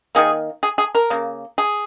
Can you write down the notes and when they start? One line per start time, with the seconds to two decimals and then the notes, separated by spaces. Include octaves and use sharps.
0.15 D#3 A#3 G#4
0.63 G#4
0.78 G#4
0.95 A#4
1.10 C#3 A#3
1.58 G#4